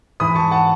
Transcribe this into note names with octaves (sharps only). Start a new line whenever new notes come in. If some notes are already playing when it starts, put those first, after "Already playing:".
G#2 E3 B5 D#6
A5 C#6
F#5 A5